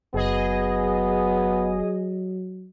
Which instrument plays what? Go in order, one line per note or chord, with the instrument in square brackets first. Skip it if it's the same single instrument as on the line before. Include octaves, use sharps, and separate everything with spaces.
[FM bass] F#1 [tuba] F#3 [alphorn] B3 [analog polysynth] G#4 D#5